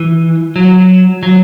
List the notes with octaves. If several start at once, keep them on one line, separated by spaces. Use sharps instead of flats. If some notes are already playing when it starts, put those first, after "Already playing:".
Already playing: E3
F#3
F#3